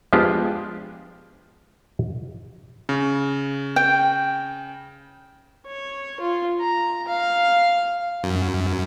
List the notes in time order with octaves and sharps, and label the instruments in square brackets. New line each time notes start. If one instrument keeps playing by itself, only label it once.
[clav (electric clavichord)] F3 G#3 B3 D4 F4 G4
[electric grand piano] C#3
[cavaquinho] G5
[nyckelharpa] C#5
F4
A#5
F5
[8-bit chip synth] F#2